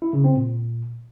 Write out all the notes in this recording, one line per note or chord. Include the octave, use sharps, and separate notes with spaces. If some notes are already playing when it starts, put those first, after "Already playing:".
E4
C#3
C4
A#2